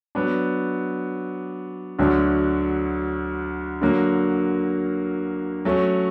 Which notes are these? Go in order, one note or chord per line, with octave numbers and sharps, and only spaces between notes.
F#3 B3 D4
D2 D3 F#3 A3 D4
D3 F#3 A#3
F#3 A3 C#4